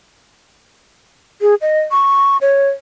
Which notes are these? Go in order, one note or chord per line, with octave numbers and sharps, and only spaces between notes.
G#4
D#5
C#6
C#5